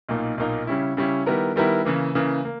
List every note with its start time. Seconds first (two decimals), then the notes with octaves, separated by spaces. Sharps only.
0.09 B1 A#2 A#3 D#4
0.38 B1 A#2 A#3 D#4
0.67 C#3 G3 C#4 E4
0.97 C#3 G3 C#4 E4
1.26 D#3 G3 B3 E4 A#4
1.56 D#3 G3 B3 E4 A#4
1.85 C#3 E3 A#3
2.15 C#3 E3 A#3
2.45 A#3